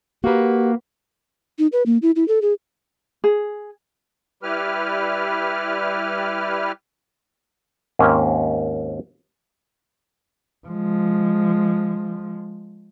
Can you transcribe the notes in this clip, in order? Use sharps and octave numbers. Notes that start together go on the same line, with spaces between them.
A#3 F#4 G4 B4
D#4
B4
A#3
E4
E4
A4
G#4
G#4
G3 E4 G4 B4 F6
D#2 G#2 A#3 C4 C#4
F3 G#3